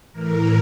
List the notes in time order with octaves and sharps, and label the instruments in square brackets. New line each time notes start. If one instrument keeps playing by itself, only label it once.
[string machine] A2 E3 A#4